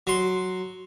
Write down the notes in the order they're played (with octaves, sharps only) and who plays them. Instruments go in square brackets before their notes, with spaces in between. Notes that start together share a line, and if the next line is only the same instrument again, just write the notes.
[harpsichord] F#3 C6